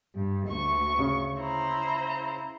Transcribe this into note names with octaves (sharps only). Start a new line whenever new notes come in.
G2
D2 C#6
C#3
E4 C5 A#5